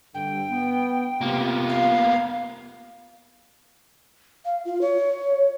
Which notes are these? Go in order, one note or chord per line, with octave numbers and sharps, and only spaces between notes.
G2 D3 G5
B3
C3 A#3 B3 F4
F5
F5
F4
C#5